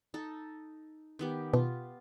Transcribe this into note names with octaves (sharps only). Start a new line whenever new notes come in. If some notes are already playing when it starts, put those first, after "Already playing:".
D#4 A4
D#3 B3 G4
B2 F4